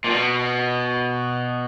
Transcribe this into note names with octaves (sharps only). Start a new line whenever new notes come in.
A#2
B2